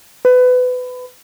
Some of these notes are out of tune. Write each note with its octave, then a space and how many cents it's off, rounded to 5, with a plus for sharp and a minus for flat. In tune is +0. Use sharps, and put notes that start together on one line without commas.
B4 +25